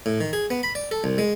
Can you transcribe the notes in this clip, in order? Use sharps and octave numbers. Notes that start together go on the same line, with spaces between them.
A2
D#3
G#4
B3
B5
D5
A4
C2
G#3